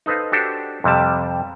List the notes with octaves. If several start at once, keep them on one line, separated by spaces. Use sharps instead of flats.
D#4 A4 B4 C5 F5
D4 F#4 G4 A4 C5
F2 C3 G3 A5